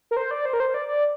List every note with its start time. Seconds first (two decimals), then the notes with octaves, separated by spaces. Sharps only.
0.11 A#4
0.17 C5
0.31 D5
0.45 C5
0.53 A#4
0.60 C5
0.74 D5
0.88 D5